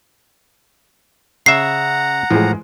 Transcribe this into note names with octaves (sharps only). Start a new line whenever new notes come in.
C#3 E5 F#5 A#5 C7
A2 E3 F3 G#3